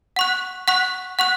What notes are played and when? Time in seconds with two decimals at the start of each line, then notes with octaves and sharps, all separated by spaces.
0.16 F#5 C#6 F#6
0.68 F#5 C#6 F#6
1.19 F#5 C#6 F#6